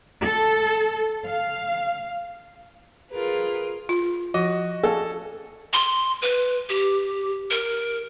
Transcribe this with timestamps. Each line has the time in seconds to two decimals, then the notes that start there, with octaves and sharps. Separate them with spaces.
0.24 A4
1.27 F5
3.11 F4 G#4 A#4 B4
3.89 F4
4.34 F3 F#4 D#5
4.84 A4 F5 G#5
5.73 C6
6.22 B4
6.69 G4
7.51 A#4